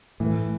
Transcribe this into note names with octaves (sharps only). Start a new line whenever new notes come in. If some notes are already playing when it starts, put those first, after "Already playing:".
A2 E3